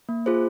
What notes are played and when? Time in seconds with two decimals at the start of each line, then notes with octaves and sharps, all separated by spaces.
0.09 A#3
0.26 F4 G#4 C5